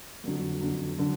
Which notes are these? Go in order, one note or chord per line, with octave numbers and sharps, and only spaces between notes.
F2 D3 F#3
F2 D3 F#3
D3 F#3